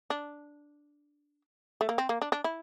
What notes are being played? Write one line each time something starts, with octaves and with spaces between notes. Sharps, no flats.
D4
A3
A#3
C4
A#3
D4
D4
E4